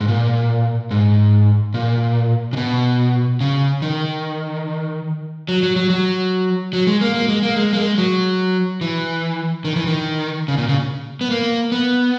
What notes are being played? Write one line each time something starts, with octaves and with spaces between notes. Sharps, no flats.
G#2
A#2
G#2
A#2
C#3
B2
C#3
D#3
F#3
F#3
F#3
F#3
F#3
G#3
A#3
A#3
G#3
A#3
G#3
A#3
G#3
F#3
E3
D#3
E3
D#3
C#3
A#2
C#3
B3
A#3
B3